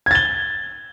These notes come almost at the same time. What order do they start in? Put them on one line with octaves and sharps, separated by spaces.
G#6 A6 G7